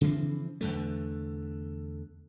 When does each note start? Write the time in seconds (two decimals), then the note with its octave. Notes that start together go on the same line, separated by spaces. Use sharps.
0.01 C#3 E3 F3 C4
0.61 E2 D3 A3